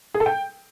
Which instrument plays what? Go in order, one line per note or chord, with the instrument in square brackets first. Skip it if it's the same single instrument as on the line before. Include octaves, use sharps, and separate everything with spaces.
[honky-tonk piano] G#4
A4
G5